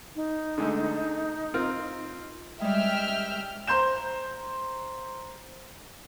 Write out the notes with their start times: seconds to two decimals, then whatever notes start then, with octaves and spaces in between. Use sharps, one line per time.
0.16 D#4
0.58 D3 G#3 A3
1.54 C4 F4 A#4
2.61 G3 G#3 E5 G5 F6
3.67 C5 A#5 C6 G6 E7